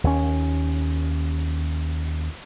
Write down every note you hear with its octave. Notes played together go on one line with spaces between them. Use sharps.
D#2 C#4